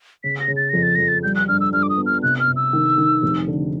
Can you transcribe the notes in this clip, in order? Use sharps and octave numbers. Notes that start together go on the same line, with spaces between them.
C#3 B6
A#6
C#3
A6
F2 A#6
A6
F2 A#6
A6
G3 G6
F#6
G2 F6
E6
G2 F6
D6
D#6
B3
F6
C3 F#6
F6
C3
E6
D#3
D#3
F1
D3